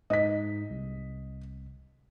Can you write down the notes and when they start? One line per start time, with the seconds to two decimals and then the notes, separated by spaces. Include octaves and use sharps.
0.10 G#2 D#5 B6
0.70 C2